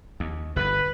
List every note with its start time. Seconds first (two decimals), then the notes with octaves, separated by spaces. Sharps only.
0.20 D#2
0.56 G1 E2 B4